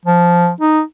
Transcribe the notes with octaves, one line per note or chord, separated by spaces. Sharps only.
F3
D#4